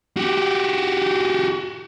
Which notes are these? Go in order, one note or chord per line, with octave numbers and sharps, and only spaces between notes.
F#4 G4